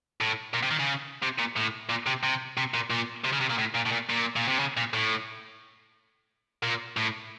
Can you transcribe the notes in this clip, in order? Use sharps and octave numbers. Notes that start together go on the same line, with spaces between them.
A2
A#2
C3
D#3
C#3
C3
A#2
A2
A#2
C3
C3
C3
A#2
A#2
C3
C#3
C3
A#2
A2
A#2
A2
A#2
A#2
A#2
C3
C#3
A#2
A2
A#2
A2